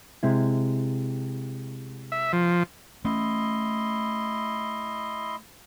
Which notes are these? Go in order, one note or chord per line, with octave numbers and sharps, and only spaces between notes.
C3 G#3 E4
E5
F3
A3 C#4 E4 D#5 C6